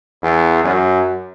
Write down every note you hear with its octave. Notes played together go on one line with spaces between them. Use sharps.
E2
F#2